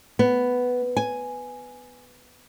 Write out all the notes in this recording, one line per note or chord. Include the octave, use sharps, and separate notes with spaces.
B3
G#5